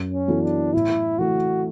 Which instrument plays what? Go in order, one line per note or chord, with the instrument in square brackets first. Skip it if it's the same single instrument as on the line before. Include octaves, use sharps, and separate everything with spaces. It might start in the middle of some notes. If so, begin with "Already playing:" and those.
Already playing: [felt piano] F#2
[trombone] C#4
[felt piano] E3 B3 F#4 A4
[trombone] D4
[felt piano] A2 [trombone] E4
[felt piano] E3 A3 [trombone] F#4